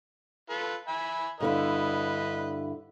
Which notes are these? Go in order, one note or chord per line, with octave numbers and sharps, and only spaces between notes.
F4 A4 B4
E5 G#5 B5
G2 D3 E4 B4 D#5